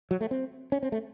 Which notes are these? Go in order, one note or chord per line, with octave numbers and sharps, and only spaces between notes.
F#3
A3
C4
C#4
C4
A3